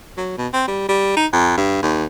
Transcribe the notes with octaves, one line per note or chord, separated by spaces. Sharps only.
F#3
B2
C4
G3
G3
D#4
F2
G2
D#2